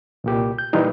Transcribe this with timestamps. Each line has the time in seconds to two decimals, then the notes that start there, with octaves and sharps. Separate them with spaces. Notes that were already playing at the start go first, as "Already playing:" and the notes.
0.24 C2 A#2 G4
0.59 G6
0.73 A#2 E3 G3 D#4